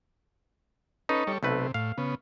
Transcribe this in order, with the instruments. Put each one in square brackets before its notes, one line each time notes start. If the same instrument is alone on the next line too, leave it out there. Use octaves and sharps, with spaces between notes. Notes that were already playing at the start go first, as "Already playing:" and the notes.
[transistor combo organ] C#4 A4 B4 [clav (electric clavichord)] D#4
[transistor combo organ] G3 A4 C#5
[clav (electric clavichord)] B1 A3 B4 [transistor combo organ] C3
[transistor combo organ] A2 [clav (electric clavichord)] F5
[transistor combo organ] C#3 B3